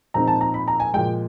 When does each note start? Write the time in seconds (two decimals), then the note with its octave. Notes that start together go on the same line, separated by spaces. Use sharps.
0.14 A#2 F3 G#3 C4 D#4 A#5
0.27 A5
0.41 A#5
0.54 B5
0.68 A#5
0.80 G#5
0.93 A#2 F3 G#3 G5